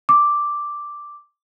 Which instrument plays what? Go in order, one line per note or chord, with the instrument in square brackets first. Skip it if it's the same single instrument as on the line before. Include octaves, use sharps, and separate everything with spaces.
[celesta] D6